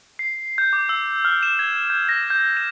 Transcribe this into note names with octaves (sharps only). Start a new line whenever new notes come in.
C7
G6
D6
E6
F6
E7
G#6
G6
A#6
G6
E7